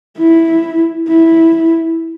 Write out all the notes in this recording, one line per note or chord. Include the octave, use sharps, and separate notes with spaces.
E4
E4